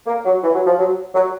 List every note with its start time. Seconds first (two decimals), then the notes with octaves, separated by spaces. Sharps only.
0.07 A#3
0.25 F#3
0.44 E3
0.55 F#3
0.67 F3
0.79 F#3
1.15 F#3